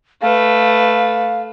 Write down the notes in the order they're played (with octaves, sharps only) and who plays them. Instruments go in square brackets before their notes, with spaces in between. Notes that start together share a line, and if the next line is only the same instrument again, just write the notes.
[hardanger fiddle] A3 B4 [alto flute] F5